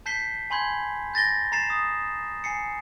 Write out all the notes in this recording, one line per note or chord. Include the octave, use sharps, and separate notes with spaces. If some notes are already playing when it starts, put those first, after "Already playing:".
A5 G6 B6 C7 G7
G#5 B5 C6 G6 G#6
G6 A6 A#6 G7
A#5 A6 C7 E7
D#6
G#5 C7 C#7